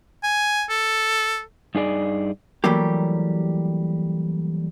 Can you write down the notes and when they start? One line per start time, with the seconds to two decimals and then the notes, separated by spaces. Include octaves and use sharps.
0.23 G#5
0.69 A4
1.75 G2 D#4 G#4 D5
2.64 E3 F#3 G3 A3 A#3 G4